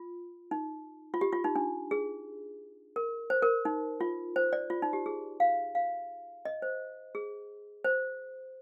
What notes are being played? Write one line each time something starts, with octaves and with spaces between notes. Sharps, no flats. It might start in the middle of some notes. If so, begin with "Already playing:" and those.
Already playing: F4
D#4
F4
G4
F4
D#4
D4
G#4
A#4
C5
A#4
D#4
F4
C5
D5
F4
D#4
G4
G#4
F5
F5
D#5
C5
G#4
C5